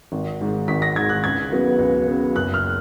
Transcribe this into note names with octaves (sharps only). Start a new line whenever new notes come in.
G#1
G#2 D#3
G#1 B6
A#6
G#2 D#3 G#6
F#6
C#2 G#6
C#3 F#3 B3
C#2
C#3 F#3 B3
F#1 F#6
F6